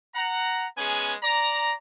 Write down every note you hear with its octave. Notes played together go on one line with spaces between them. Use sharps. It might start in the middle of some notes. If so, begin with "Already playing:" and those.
F#5 A#5
G#3 B3 C#4 G#4 G#5
D5 A#5